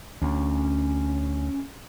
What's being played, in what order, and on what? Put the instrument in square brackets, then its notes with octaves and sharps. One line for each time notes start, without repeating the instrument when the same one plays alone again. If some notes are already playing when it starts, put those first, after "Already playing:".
[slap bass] D2 [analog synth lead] C#4